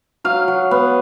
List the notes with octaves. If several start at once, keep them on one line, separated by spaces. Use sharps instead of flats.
F#3 F5
F#3
B3